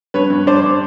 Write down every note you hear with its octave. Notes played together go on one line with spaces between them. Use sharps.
G2 B4 C#5
G2
G2 C5 D5